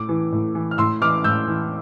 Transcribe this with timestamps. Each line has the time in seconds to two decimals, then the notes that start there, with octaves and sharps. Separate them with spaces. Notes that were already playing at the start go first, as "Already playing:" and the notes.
Already playing: A2 D6
0.09 E3
0.32 A2
0.55 E3
0.71 F6
0.78 A2 C6 E6
1.02 E3 D6 F6
1.24 A2 E6 G6
1.48 E3